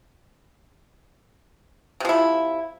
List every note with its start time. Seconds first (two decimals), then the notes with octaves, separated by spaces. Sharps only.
2.00 C3
2.05 F3
2.09 E4